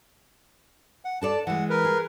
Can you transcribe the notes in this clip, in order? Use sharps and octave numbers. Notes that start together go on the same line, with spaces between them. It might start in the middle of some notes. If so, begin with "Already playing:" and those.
F#5
D4 A4 D5 A5
E3 G#3 F#5
A#4 B4
G#4